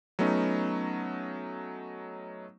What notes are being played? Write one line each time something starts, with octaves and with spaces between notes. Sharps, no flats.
F#3 A3 B3 C#4 D#4